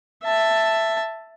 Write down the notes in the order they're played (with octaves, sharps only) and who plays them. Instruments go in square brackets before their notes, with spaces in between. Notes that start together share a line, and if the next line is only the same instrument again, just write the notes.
[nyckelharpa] E5 A5